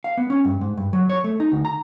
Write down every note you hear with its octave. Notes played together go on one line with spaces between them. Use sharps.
F5
B3
C#4
G2
G#2
G2
F#3
C#5
A3
D#4
D2
A#5